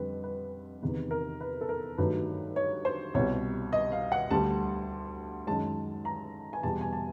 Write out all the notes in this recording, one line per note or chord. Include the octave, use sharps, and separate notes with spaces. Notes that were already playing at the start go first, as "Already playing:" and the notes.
Already playing: F2 D3 G3 B4
B4
E2 C3 D#3 B4
A#4
B4
A4
A#4
G2 D#3 F#3 A3 B4
C#5
C5
C2 B2 G3 C#5
D#5
F5
F#5
D2 D3 G3 A5
F#2 D#3 G#3 A5
A#5
G#5
E2 B2 G3 A5
G#5
A5